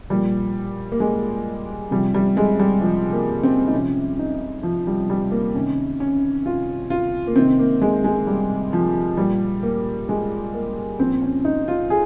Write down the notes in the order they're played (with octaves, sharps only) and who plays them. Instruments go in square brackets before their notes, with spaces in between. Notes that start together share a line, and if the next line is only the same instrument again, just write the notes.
[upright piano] A#2 F3 G3
A#3
G#3
C3 F3 G3
G3
G#3
G3
F3
A#3
C4
D#4
C3 F3 C#4
D#4
F3
G3
G3
A#3
C3 D#3 C#4
C#4
F4
F4
A#3
C3 D#3 C4
A#3
G#3
G#3
G3
F3
A#2 F3 G3
A#3
G#3
A#3
A#2 F3 C4
C#4
D#4
F4
G#4